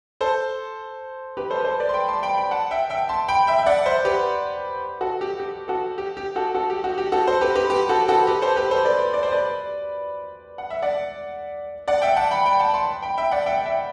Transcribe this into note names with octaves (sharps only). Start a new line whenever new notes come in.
A4 C5
G4 B4
A4 C5
B4
A4 C5
B4 D5
C6
G5 B5
A5 C6
G5 B5
G5 B5
F#5 A5
E5 G5
E5 G5
A5 C6
G5 B5
E5 G5
E5
D5 F#5
C5 E5
G4 B4
F#4 A4
G4
G4
F#4 A4
G4
G4
F#4 A4
F#4 A4
G4
F#4
G4
F#4 A4
A4 C5
G4 B4
G4 B4
G4
F#4 A4
F#4 A4
G4 B4
A4 C5
G4 B4
A4 C5
B4 D5
D5
C5
B4 D5
F#5
E5
D5 F#5
D5 F#5
E5 G5
F#5 A5
G5 B5
G5 B5
F#5 A5
A5 C6
G5 B5
E5 G5
D5 F#5
E5 G5
E5 G5